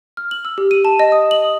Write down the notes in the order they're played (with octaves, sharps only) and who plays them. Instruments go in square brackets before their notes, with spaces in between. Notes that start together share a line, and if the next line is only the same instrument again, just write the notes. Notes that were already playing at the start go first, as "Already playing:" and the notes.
[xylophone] F6
F#7
E6
G4
D#7
A5
D#5
D#6
F#7
D#6